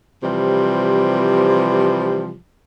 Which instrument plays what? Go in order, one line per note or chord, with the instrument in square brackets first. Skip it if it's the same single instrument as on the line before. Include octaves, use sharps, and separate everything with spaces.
[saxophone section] C3 E3 F3 G3